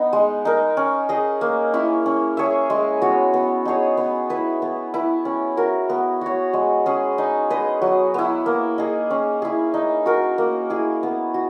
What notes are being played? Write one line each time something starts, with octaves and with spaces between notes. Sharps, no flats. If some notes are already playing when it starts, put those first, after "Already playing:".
Already playing: B3 D#4 D#5
G#3
D#4 A#4
C#4
G#4 D#5
A#3
C#4 E4
C#4
G#4 C#5 E5
G#3
B3 F#4 C#5
B3
D#4 G#4 C#5
B3
E4 B4 E5
B3
E4 B4
C#4
F#4 A#4
B3
F#4 C#5
G#3
C#4 G#4
D#4
G#4 B4 D#5
F#3
B3 E4
A#3
D#4 G#4
C#4
E4 G#4
D#4
F#4 A#4
A#3
E4 G#4
B3
F#4